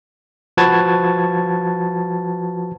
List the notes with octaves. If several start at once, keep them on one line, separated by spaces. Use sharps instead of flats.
F3 F#4 B4 A5 G#6 A6